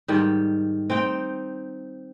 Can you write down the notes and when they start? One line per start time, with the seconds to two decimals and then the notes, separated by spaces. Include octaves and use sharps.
0.08 G#2 D#3 G3
0.90 C4 D#4 G5